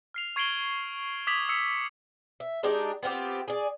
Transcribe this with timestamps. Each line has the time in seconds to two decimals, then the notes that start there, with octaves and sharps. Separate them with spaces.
0.14 F6 C7 F7
0.36 C#6 G#6 C7 D7 F#7 G7
1.27 D6 D#6 G#6 B6 F7 F#7
1.49 D#6 E6 C7 C#7
2.40 E5
2.63 G#3 D4 D#4 G4
3.03 B3 C4 F4 G4
3.48 G#4 D5